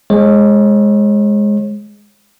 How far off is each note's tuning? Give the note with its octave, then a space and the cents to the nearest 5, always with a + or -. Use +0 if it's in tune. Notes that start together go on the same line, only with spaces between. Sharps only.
G#3 +0 C#5 -40